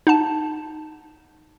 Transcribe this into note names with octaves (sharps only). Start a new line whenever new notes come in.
D#4 F#5 A5